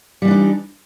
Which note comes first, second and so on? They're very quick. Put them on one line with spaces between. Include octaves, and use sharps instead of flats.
G3 E3 D4 D#4